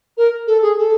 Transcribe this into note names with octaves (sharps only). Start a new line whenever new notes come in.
A#4
A4
G#4
A4